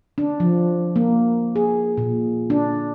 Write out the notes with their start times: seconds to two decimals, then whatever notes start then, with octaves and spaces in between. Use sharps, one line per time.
0.18 D4
0.40 F3
0.96 A#3
1.56 G#4
1.98 A#2
2.50 D4